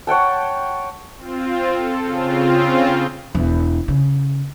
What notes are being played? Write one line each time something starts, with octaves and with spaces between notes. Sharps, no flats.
C#5 F#5 G5 A5
C4 F4
A4
C#3 C4 F4
E1 E2
C#3